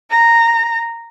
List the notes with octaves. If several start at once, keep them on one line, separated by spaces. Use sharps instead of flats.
A#5